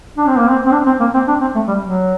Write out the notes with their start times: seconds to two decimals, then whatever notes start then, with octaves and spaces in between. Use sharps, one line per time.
0.17 D4
0.27 C4
0.38 A#3
0.48 C4
0.66 C4
0.72 D4
0.86 C4
1.00 A#3
1.14 C4
1.28 D4
1.41 C4
1.55 A3
1.68 G3
1.81 F#3